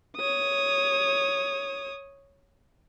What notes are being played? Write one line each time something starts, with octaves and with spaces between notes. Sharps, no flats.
C#5 D#6